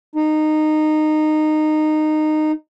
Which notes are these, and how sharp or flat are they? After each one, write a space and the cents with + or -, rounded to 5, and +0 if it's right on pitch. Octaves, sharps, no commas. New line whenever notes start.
D#4 -15